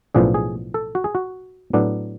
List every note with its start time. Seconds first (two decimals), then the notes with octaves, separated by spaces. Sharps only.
0.14 B1 A2 F3 B3 D4 G#4
0.34 G#4
0.74 A4
0.95 F#4
1.04 G#4
1.15 F#4
1.73 A2 F#3 B3 D4